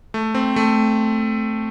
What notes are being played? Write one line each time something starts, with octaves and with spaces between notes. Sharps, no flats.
A3
C4
A3